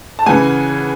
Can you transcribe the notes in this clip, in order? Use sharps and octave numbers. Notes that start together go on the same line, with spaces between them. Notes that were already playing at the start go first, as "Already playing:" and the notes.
A5
C#3 E3 F#5 G#5